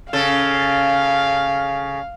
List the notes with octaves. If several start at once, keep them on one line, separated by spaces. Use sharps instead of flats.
C#3 A4 F5